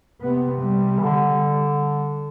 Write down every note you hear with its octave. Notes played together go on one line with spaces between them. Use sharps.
C3 B3
G3
E3
D3